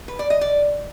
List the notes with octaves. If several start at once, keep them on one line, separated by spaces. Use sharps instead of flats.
B4
D5
D#5
D5